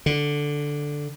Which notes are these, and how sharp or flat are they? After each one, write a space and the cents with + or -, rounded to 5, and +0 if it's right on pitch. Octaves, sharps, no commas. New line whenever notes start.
D3 -5